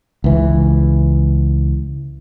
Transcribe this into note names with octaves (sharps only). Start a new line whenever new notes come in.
C#2 E3